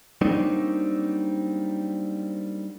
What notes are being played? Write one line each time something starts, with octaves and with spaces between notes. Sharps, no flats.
F#3 G3 A#3 C4 D4 D#4